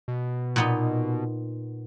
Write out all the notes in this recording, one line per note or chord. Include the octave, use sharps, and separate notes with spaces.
B2
A#2 B3 D#4